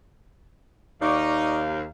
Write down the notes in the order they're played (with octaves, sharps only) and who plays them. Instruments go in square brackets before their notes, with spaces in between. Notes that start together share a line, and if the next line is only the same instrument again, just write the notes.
[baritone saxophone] D#2 [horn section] D#4 [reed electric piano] D5 C#6 D6 [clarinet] F5